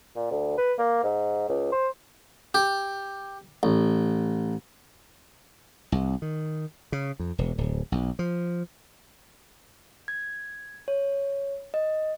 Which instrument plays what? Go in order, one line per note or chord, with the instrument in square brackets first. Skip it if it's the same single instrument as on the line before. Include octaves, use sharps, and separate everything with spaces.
[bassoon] A#2
D2
B4
A#3
G#2
C#2
C5
[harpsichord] G4
A1
[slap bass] C2
D#3
C#3
F2
E1
D1
B1
F3
[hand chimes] G#6
C#5
D#5